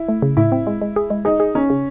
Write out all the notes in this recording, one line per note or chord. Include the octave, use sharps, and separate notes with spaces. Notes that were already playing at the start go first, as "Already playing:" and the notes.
Already playing: E4
A3
C#3
A2 E4
C4
G#3
G#3
G#4
G#3
D#4 G#4
G#4
C#4 D#4
C#3